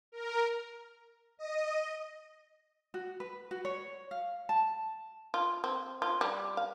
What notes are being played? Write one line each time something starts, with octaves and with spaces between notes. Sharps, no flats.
A#4
D#5
F#4
B4
F#4
C#5
F5
A5
F4
C4
F4
G3
F5